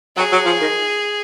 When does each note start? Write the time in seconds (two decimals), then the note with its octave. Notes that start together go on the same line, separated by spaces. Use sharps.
0.17 F#3 G#4
0.32 F#3
0.46 F3
0.61 D#3